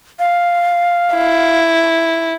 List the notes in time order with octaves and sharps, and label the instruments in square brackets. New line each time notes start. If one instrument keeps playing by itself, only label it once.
[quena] F5
[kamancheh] E4